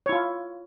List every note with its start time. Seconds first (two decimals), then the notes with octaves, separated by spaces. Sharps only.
0.06 C#5
0.09 E4
0.12 F4